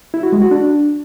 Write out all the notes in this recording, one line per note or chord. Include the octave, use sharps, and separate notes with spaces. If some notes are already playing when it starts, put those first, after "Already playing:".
E4
F#4
G#3
F#4
D4